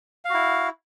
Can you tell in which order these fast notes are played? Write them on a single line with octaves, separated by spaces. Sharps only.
F5 F#4 E4